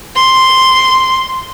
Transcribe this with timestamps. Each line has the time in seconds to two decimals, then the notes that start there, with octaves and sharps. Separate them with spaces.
0.15 C6